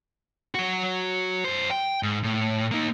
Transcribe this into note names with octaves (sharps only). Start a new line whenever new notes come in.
F#3 F#4
F#2 C5
G5
G#2
A2
A#3 D#4